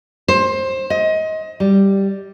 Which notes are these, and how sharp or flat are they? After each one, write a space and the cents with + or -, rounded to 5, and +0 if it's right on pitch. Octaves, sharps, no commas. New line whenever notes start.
C5 +20
D#5 +25
G3 +0